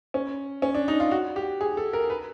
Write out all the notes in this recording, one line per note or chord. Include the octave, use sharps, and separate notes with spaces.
C#4
C#4
D4
D#4
F4
F#4
G4
G#4
A4
A#4
B4